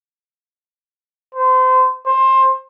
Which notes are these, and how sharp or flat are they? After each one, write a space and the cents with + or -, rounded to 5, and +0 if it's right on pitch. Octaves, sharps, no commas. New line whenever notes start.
C5 -30
C5 +20